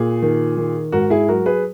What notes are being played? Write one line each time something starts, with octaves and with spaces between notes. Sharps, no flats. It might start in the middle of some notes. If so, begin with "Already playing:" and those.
Already playing: A#2 G#4
D#3
D#3
G#2 F#4 A#4
E4 G#4
F#3 F#4 A#4
G#4 B4